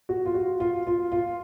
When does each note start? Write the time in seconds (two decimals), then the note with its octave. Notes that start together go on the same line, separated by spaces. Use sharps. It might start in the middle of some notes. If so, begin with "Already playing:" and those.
0.09 F#4
0.26 F4
0.34 F#4
0.60 F4
0.87 F4
1.12 F4